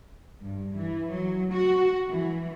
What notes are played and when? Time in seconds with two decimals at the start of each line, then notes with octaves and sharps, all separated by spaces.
0.43 G2
0.76 E3
1.10 F#3
1.53 F#4
2.08 E3